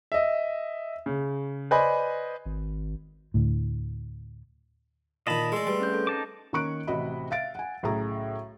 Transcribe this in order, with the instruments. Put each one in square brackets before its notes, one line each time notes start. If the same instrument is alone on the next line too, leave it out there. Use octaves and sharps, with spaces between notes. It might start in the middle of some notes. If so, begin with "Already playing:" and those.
[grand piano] D#5 E5
C#3
B4 C5 D5 D#5 G#5 B5
[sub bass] G#1
[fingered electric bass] D2 A2
[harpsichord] A#2 D#3 [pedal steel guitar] D#5 A5 B5
[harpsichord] G#3 D5 [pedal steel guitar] A3 C6 E6
[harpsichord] G3 [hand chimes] G#4 B4
[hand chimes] C4 C#4 G6
A4
[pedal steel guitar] D#4 A5 D6
[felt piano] D#3 A#3 C#4 C#6 F#6 D7
A1 C3 F#4 D#5 B5
E5 F5 A6 D7
F#5 G#5
B1 A2 C#3 G#4 A#5